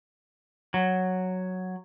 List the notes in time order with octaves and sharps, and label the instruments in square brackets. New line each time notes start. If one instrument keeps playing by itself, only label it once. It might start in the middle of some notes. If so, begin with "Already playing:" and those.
[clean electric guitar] F#3